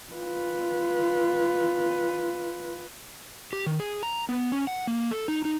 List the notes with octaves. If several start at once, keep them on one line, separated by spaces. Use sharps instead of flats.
F4 B4
G4
D#3
G#4
A#5
B3
C#4
F#5
A#3
A4
D#4
D#4